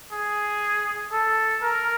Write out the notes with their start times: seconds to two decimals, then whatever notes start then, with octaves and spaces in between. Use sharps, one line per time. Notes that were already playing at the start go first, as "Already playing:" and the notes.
0.12 G#4
1.12 A4
1.62 A#4